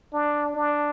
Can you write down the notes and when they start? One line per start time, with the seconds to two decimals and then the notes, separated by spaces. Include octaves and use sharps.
0.13 D4
0.55 D4